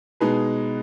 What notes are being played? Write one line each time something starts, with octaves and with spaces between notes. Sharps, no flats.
B2 G#3 D#4 G#4 B4